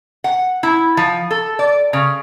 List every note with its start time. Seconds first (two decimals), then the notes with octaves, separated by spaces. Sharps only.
0.24 F#5
0.63 E4
0.97 F3
1.31 A4
1.59 D5
1.93 C#3